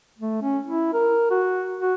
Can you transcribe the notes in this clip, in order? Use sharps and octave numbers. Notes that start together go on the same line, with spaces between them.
A3
C#4
E4
A#4
F#4
F#4